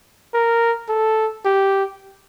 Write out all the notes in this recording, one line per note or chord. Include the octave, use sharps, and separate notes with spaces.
A#4
A4
G4